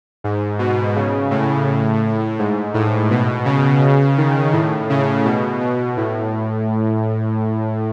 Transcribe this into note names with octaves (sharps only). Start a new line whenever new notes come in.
G#2
B2
C#3
A2
G#2
A2
B2
C#3
D#3
A2
C#3
B2
B2
A2